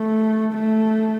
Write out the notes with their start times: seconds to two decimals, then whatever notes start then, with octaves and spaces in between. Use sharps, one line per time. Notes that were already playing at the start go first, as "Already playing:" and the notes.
Already playing: A3
0.53 A3